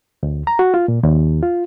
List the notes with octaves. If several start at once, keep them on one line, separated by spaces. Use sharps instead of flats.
D2
A#5
F#4
F4
A#2
D#2
F4